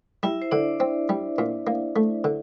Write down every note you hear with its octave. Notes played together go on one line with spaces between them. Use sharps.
G3 E4 E5
C5
D3 D4 D5
C4
G3
A#2
A#3
A3
D3